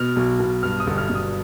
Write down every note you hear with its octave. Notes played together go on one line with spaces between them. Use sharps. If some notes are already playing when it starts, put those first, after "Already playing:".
Already playing: B2 F6
B1
B2
G2 F6
D#6
G1
F6
G1
D#6